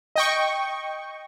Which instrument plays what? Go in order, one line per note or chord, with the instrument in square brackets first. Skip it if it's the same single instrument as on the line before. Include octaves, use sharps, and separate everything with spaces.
[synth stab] D#5 G5 C#6